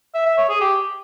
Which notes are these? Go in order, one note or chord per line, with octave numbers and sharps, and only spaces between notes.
E5
E5
C#5
G#4
G4